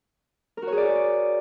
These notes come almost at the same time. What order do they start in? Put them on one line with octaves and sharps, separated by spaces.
A#4 F#4 C#5 G#4 D5